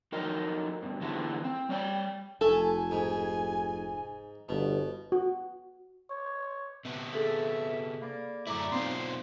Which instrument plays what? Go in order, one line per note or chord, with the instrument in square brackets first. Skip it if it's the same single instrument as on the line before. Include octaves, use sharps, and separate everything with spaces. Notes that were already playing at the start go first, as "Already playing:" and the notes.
[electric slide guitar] F2 F#3 D#4 A#4 D#5
G2 B2
D3 E3 G#3 B3 E4 G4
C4
G3 C#5 D5 F#5 G5
[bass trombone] F1 [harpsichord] A3 [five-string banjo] A4 [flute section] G#5
[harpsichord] G#2
[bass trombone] G1 [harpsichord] B2
[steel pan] F#4
[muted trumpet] C#5
[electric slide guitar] C3 B3
[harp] G#4 A4 F5 [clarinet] E5
[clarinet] A#3 [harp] D5 F5 B5
[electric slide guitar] F#2 A2 E4 [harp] D5 A#5 D6
[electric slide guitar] B2 F#3 F4 [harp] C4 D#4 [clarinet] C6